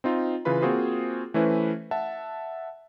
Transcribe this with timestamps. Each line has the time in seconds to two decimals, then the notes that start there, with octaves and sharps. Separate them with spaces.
0.04 C4 D#4 F4
0.45 C#3 E3 F4 B4 B5
0.62 A#3 C4 F4 F#4 G#4 C5
1.34 E3 A3 C#4 E4 B4 C5
1.91 E5 F#5 A5